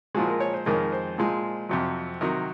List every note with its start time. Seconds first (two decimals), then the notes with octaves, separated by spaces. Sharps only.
0.15 A#2 F3 G#3 F#4
0.28 A#4
0.40 C#5
0.54 C5
0.66 F2 D#3 G#3 A#4
0.92 C5
1.18 A#2 F3 G#3
1.69 F2 C3 F#3
2.21 C3 D#3 F#3 A#4